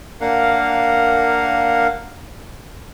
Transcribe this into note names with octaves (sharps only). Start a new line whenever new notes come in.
A#3 D4 A#4 F5 F#5